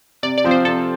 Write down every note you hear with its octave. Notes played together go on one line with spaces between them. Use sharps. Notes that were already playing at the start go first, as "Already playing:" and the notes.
C3 D5
D5
F3 C4 F4
C5
C3 A4